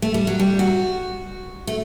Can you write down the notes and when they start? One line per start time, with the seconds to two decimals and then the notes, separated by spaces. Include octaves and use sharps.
0.02 A3
0.14 G3
0.27 F#3
0.40 G3
0.59 F#4
1.67 A3